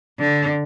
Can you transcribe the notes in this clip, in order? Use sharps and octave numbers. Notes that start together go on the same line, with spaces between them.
D3